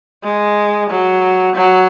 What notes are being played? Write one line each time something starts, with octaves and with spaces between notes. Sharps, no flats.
G#3
F#3
F#3